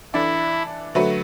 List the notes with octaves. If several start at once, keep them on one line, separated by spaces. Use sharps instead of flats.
E3 D4 E4 A4 D5
D3 F#3 A3 F#4 B4